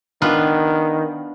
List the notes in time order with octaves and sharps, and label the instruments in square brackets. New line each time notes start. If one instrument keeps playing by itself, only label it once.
[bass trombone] D#3 [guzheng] B3 D4 F4